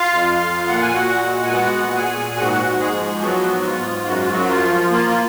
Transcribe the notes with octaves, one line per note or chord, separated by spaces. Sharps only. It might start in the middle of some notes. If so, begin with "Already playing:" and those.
Already playing: F4 F5
F2
F2
A#2 F#5
G#5
A#2 F#4 F#5
G#3
G#5
B3 F#4 F#5
A#2
G#4 G#5
A#2
G#2 F#4 F#5
G#2
G#3 G#4
F3
F#3 B3 F#4
G#2
F4
G#2
F#2 F#4
F4
F#2 F#3 F#4
F4
F3
A#3 F4
F4